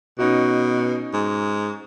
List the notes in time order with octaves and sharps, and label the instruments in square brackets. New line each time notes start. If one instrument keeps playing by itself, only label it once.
[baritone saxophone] B2 [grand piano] C#4 D#4 F#4
[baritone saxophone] G#2